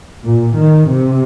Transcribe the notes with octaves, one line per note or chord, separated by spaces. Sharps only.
A#2
D#3
C3